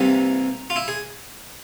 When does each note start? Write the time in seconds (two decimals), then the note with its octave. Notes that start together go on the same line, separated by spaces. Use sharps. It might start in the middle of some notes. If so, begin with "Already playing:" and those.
Already playing: C2 C3 E3 G3 A#3 D#4
0.70 F4
0.76 E4
0.88 G#4